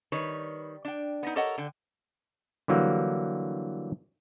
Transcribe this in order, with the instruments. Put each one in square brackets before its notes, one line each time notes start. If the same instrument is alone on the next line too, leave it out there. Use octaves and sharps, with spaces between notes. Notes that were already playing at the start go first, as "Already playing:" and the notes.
[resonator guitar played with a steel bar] D#3 G3 B4 C#5
D4 G5
B3 D#4
G4 A4 A#4 C#5 D#5 F#5
D3 G5
[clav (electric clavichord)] D3 E3 F#3 G3 A#3